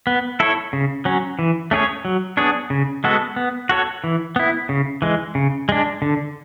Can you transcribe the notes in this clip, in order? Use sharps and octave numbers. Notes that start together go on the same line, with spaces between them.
B3
E4 A4 C#5
C#3
F#3 C#4
E3
A3 C#4 G#4 C#5
F#3
B3 D4 G#4 C#5
C#3
G#3 B3 F#4 A4
B3
F#4 A4 C#5
E3
B3 E4
C#3
E3 G#3
C#3
G#3 D4
D3